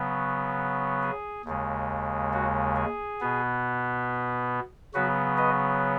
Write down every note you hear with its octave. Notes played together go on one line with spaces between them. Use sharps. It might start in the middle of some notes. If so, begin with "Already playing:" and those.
Already playing: C#3 F#3 B3
G#4
D#2 C#3 G#3
F#4
G#4
B2 B3
C#3 F#3 B3 F#4 B4
B4 D#5